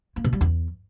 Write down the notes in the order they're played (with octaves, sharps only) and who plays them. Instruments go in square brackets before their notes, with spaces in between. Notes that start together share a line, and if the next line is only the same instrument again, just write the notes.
[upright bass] A#3
B2
G3
E2